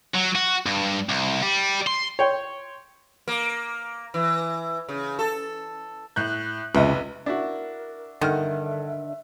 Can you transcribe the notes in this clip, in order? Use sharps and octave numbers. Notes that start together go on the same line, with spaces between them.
F#3
F#4
G2
C2
G3
C6
C#5 G5 C6
A#3
E3
C#3
A4
A2 F#6 G6
F1 C#2 B4 D#5 E5
D4 E4 F#4 A#4
G2 D3 D#3 E5 F#5 F6